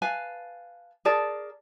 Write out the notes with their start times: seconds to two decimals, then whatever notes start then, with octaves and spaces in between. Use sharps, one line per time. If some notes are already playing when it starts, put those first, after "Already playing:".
0.02 B4 F5 G#5 A5
1.05 G#4 A#4 D5 A5